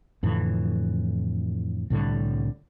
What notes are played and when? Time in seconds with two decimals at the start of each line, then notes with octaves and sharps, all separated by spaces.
0.23 F2 A2 D3 E3
1.90 C2 A2 D3 G3